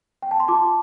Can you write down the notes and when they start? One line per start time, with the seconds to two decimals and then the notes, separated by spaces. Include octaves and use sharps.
0.22 G5
0.31 A5
0.40 C6
0.48 F4 A5 D6